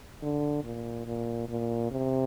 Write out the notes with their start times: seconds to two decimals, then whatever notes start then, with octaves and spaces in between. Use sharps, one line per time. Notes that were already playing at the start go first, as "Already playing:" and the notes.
0.22 D3
0.64 A#2
1.06 A#2
1.49 A#2
1.92 C3